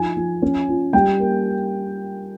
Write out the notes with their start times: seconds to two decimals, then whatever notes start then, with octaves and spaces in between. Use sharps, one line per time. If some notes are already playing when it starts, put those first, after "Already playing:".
Already playing: F3 D#4 G#5
0.17 F3
0.42 C#4
0.69 F4
0.93 G3 G5
1.19 A#3